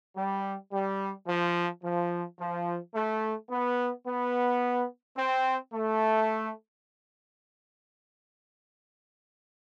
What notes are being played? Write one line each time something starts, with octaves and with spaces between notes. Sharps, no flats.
G3
G3
F3
F3
F3
A3
B3
B3
C4
A3